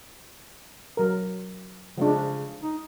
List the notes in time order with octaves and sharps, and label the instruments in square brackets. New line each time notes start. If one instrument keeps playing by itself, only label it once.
[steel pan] F#3 A#4
[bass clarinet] C#3 [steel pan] F3 G#3 D4
[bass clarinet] D#4